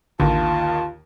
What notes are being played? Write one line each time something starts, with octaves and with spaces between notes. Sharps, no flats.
A1 D#2 D3 D#3 F4 A5